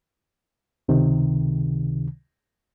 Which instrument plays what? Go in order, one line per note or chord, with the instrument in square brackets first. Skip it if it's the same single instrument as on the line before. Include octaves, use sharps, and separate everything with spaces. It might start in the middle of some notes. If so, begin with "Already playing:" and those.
[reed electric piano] C#2 C3 D#3